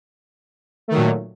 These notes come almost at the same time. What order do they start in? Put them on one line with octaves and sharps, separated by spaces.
A3 D#3 F#3 A#2